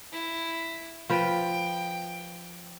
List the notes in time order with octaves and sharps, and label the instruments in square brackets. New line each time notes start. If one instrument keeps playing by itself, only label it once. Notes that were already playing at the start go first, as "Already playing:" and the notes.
[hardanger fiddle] E4
[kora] F3 B4 [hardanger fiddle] G5